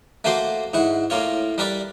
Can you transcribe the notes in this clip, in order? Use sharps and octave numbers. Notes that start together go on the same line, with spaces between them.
A3 A#3 F#4 C5 C6 D6
G#2 E4 F#5
A2 A#3 F4 C#5
G3 A#4 B4 D5